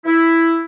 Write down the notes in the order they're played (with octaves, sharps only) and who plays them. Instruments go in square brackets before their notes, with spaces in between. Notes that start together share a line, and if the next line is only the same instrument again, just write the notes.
[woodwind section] E4